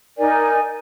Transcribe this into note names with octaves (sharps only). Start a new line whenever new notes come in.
D#4 A#4 D5 G#5